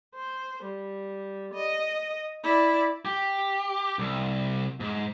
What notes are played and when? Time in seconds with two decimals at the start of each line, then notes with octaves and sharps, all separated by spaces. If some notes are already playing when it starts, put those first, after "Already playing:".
0.15 C5
0.63 G3
1.53 D#5
2.43 E4 D5
3.05 G4
3.99 C2
4.80 G#2